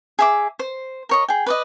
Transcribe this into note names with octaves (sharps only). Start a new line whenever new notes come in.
G#4 E5 D6
C5
A#4 C#5 D#5
G#4 G5
B4 D5 D#5